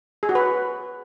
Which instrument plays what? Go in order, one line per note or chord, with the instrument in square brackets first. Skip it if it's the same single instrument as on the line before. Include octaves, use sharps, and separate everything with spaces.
[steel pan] G#4
F#4
B4